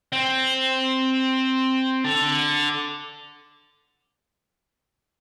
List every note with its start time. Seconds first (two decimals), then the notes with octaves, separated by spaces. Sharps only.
0.12 C4
2.04 D3